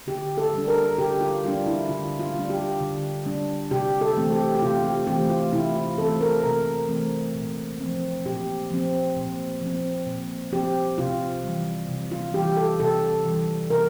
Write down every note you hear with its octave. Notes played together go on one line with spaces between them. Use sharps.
D3 G4
A4
G3 D4
A#4
D3 G4
F4
G3 D4 F4
E4
D3 F4
F4
G3 D4
G4
D3
G3 D4
C3 G4
A4
E3 A3 C4
G4
G4
C3 F4
G4
E3 A3 C4 G4
F4
C3 E4
F4
E3 A3 C4 A4
A#4
C3 A#4
E3 A3 C4
A#2
F3 C4
A#2 G4
F3 C4
A#2
F3 C4
A#2
F3 C4 G4
C3 F4
E3 G3
C3
F4
E3 G3 G4
A4
C3 A4
E3 G3
C3 A#4